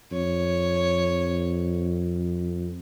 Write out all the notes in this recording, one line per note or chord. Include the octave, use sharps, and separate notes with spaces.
F2 C#5